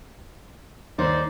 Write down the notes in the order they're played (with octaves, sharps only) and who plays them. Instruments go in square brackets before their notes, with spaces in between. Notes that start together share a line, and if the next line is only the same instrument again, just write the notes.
[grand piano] D#2 [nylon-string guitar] D#4 [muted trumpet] C5 [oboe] D5